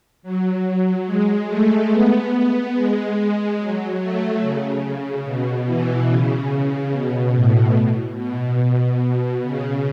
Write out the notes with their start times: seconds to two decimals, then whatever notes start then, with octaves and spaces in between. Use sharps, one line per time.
0.23 F#3
1.06 G#3
1.48 A3
1.90 B3
2.73 G#3
3.58 F#3
3.99 A3
4.41 C#3
5.25 B2
5.66 E3
6.08 C#3
6.92 B2
7.34 A2
8.17 B2
9.43 C#3